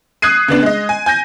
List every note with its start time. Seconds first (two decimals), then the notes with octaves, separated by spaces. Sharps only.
0.22 D#6 F#6 G#6 C7 D#7
0.48 C#3 B3 D4
0.63 G#3 D#5
0.89 G#5
1.06 G#5 G6 A#6